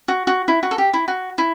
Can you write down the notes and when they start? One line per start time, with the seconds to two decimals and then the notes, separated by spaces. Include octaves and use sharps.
0.08 F#4
0.27 F#4
0.48 E4
0.63 F#4
0.71 A4
0.78 G4
0.93 E4
1.08 F#4
1.38 E4